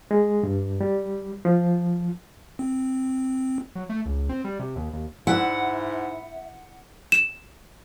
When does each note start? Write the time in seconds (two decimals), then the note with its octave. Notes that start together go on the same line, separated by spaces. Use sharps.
0.11 G#3
0.43 G2
0.81 G3
1.45 F3
2.59 C4
3.75 F#3
3.89 A3
4.06 C#2
4.29 C4
4.44 G3
4.59 C3
4.76 D#2
4.93 D#2
5.27 G#2 E4 E5 F#5
7.12 E7